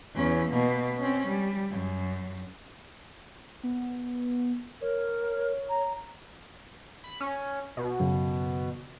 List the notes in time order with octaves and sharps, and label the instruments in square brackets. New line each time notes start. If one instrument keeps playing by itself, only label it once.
[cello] E2 C#4
B2 A#3
C4 C#4
G3
F#2
[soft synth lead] B3
[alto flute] A#4 [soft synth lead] C#5
[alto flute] A#5
[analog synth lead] B5
C#4
B2
[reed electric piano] F#2 C#3